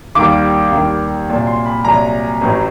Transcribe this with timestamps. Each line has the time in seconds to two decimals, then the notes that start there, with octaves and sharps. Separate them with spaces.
0.15 D#2 D#3 G3 D6
0.71 D#2 D#3 G3
1.28 C2 A#2 F#3
1.47 C6
1.66 B5
1.84 C2 A#2 F#3 A#5
2.41 A1 A2 F#3